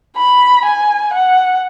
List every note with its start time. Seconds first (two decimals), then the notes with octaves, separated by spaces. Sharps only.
0.17 B5
0.65 G#5
1.14 F#5